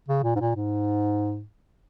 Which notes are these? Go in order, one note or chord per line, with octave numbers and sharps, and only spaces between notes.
C#3
A#2
G#2
A#2
G#2